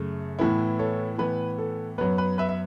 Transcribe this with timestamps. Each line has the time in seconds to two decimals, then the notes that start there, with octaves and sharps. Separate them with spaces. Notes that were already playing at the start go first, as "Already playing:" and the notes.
Already playing: F#2 C#3 A3
0.39 A2 E3 B3 E4
0.79 A4 C#5
1.18 A2 E3 B3 B4
1.58 A4
1.98 F#2 F#3 B3 B4
2.18 B4
2.38 B4 E5
2.49 E5